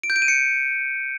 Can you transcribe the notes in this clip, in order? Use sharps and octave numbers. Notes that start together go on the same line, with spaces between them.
D7
G6
D7
D#7
C#7